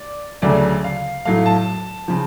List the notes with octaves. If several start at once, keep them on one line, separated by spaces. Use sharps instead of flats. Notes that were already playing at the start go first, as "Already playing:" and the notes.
Already playing: D5
D2 C#3 F#3 A3 D5
F5
A2 F#3 A3 F5
A5
C#3 F3